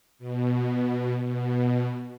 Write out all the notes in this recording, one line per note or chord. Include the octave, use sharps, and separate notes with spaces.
B2
B2